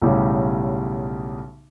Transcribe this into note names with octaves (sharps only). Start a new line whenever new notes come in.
B1 A2 C#3 G3 G4